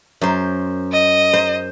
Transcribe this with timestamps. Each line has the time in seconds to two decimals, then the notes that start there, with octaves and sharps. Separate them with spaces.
0.21 F#2 C5
0.92 D#5
1.33 C5